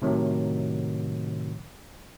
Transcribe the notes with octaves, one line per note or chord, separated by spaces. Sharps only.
A2 C3 D#3 F#3